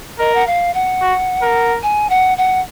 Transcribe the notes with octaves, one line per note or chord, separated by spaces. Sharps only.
A#4 D#5
F#5
F5
F#5
F#4
A#4
G#5
F#5
F#5